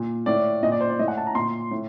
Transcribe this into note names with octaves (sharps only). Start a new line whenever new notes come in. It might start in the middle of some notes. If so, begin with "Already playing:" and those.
Already playing: A#2
A2 D5
A#2 D#5
D5
C5
D5
A2 D#5
F#5
A5
A#5
A#2 C6
A2